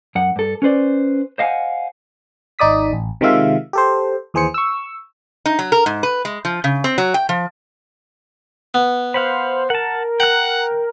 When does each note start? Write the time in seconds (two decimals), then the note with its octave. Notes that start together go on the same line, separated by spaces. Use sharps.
0.15 F#2 F#5
0.36 G2 A4
0.62 C#4 B4 C5 D5
1.38 C5 D#5 F5 F#5 G#5
2.59 G#1 D#4 D5 D#6 B6
2.93 A1
3.21 C3 D#3 G#3 F4 E5 F5
3.73 G4 A4 C5
4.34 D#2 E3 G#4 C5 C#7
4.54 C#6 E6
5.46 D#4
5.59 F#3
5.72 A#4
5.86 G#2
6.03 B4
6.25 G#3
6.45 F3
6.64 C#3
6.84 C4
6.98 F#3
7.14 G5
7.29 F3
8.74 B3
9.14 C5 F5 F#5 B5
9.70 A#4 F#5 A5
10.20 F#5 G5 A#5 F#6